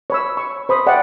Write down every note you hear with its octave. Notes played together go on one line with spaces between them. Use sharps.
C#5 B5 E6
C#6
C5 B5 D#6
D5 E5 F#5 G5